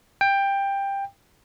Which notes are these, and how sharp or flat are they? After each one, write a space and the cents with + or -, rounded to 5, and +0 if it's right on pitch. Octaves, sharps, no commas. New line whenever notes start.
G5 +15